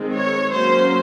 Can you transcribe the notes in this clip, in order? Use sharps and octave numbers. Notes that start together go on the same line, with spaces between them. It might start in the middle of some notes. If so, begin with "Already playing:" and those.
Already playing: D#3 G#3 C4
C#5
F#3 A#3 C#4 C5